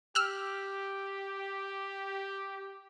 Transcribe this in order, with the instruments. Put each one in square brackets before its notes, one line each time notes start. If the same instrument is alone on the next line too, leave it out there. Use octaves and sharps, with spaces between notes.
[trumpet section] G4 [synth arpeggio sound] E6 F6